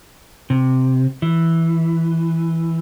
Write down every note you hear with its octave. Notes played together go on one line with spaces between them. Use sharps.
C3
E3